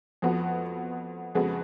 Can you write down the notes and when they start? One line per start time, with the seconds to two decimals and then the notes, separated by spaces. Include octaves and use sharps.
0.22 F2 F3 B3 F#4
1.35 F2 C#3 G#3 B3 F#4